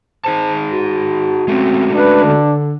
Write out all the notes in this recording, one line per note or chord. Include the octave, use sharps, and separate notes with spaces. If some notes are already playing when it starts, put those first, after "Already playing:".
D#4 G#4 C5 A5
F#4
G#3 A3 C4 C#4
D4 B4
D3